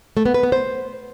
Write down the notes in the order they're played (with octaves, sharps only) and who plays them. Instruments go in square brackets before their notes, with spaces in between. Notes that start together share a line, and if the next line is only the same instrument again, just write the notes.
[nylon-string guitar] A3
B3
B4
B3
C5